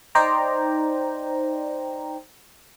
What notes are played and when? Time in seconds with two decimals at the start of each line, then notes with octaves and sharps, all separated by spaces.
0.15 D#4 C5 D5 G5 A#5